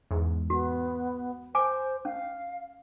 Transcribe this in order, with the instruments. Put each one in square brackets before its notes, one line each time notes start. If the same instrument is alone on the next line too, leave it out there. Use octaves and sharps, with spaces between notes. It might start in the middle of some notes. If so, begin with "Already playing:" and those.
[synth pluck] E2 G#2
[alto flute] B3 [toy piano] F#4
[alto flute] C5 [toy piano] G#5 D6
[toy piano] C#4 [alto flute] F5